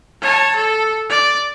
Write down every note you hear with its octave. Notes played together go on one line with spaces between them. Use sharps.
C#5 A5
A4
D5